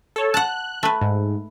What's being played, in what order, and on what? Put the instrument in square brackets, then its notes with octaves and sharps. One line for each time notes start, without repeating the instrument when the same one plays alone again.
[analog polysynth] A4 C#5
[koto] F#5 A5 [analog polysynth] F#6
[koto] A3 B4
[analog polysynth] G#2